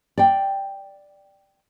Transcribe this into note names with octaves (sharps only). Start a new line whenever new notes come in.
D5 G5